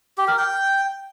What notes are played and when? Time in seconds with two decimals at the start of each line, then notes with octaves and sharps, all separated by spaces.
0.18 G4
0.28 A#4
0.38 G5